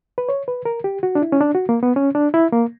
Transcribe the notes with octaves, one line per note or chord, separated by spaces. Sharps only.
B4
C#5
B4
A#4
G4
F#4
D4
E4
C#4
D4
F#4
A#3
B3
C#4
D4
E4
A#3